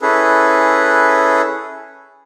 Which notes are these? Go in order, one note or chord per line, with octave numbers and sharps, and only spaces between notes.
C#4 E4 G#4 A4 B4